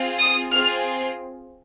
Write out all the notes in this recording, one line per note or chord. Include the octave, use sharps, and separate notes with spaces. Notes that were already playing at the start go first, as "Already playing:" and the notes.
Already playing: C4 F4 G#4
D#6
C4 F4 G#4 F6